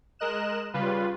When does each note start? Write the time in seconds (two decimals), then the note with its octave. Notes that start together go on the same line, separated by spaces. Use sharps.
0.19 G#3 A#4 D#5 F#6 E7
0.74 C#3 G3 F4 B4